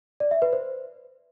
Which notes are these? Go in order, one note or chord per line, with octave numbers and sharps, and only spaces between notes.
D5
E5
B4
C5